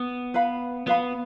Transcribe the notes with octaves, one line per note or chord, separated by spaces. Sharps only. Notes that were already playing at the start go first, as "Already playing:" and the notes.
Already playing: B3
B4 F5 B5
B3 B4 F5 B5